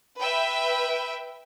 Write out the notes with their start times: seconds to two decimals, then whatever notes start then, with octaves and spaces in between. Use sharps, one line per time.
0.18 B4 E5 G5